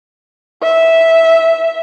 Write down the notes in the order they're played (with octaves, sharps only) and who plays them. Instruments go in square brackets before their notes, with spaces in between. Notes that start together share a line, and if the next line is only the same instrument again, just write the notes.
[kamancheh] E5